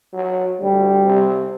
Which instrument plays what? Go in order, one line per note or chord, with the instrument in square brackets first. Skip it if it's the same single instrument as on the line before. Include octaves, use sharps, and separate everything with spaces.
[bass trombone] F#3
[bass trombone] D2 [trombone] G3
[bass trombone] C3